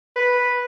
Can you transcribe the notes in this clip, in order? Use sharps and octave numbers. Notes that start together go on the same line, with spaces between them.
B4